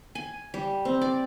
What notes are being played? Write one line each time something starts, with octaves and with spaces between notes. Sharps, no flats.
G#5
G3
C4
D5